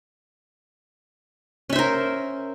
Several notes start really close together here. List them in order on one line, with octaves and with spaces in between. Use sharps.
C#4 E5 C5 A#4